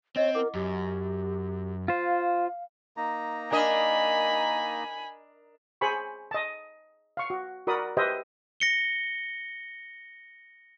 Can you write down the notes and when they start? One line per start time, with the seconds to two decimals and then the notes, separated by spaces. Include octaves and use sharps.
0.16 C4 C#4 C#5 D#5
0.35 E4 A#4 F#5 D6
0.55 F#2 G4
1.88 F4 C5 F5
2.97 A#3 D#4 A#5
3.52 D4 A#4 D#5 G#5 B5
5.81 G#4 C5 G#5 B5 C#6
6.31 D#5 A5
7.17 F5 C#6
7.30 F#4
7.67 F#4 A#4 D5 B5 D#6
7.97 G4 B4 C5 D#5 E5 G5
8.60 A#6 C#7 G7